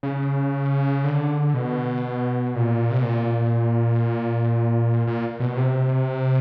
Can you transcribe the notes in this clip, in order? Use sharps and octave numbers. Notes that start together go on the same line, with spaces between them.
C#3
D3
B2
A#2
C3
B2
A#2
A#2
B2
C3